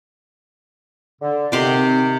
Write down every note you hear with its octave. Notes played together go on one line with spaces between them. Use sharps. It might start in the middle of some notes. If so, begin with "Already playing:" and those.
D3
C3 D#3 C4 C6 D6